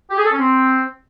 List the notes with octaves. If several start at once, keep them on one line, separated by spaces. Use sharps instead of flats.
G4
G#4
A4
C#4
C4